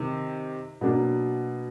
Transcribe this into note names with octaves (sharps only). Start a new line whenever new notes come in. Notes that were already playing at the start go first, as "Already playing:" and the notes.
Already playing: C3 D#3
B2 F#3 A#3 D4